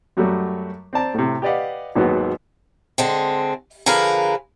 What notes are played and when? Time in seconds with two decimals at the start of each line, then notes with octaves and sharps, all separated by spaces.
0.17 F#2 F#3 G3 A3
0.93 C4 D5 A5 A#5
1.14 A2 C3
1.42 G4 B4 D5 D#5 F5 F#5
1.95 G#1 D#2 G#2 F#3 B3 F#4
2.98 D3 G#3 C4
3.86 D3 F3 G#4 A#4 B4 F5